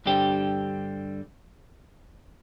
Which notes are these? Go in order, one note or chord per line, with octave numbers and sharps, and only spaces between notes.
G2 D3 G3 C4 G4